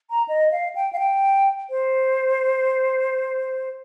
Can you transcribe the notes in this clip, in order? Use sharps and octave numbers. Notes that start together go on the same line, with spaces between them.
A#5
D#5
F5
G5
F5
G5
C5